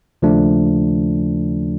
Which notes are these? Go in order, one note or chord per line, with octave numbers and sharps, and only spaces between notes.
D#2 C#3 F3 A3 D4